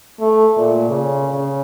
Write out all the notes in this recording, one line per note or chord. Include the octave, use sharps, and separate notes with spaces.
A3
A#2
C#3
C#3